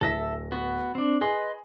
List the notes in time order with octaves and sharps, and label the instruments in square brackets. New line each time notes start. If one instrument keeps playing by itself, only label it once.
[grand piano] D1 A#6 [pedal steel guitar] A4 E5
[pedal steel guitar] B3 F#4
C4 D4
[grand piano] G#4 [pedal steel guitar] B4 D#5 C6